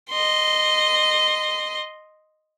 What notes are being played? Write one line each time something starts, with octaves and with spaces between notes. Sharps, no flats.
D#5 C6